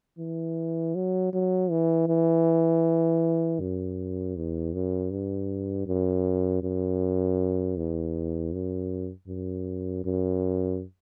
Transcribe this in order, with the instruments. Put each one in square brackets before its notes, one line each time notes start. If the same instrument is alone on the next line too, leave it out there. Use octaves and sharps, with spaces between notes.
[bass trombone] E3
F#3
F#3
E3
E3
F#2
E2
F#2
G2
F#2
F#2
E2
F#2
F#2
F#2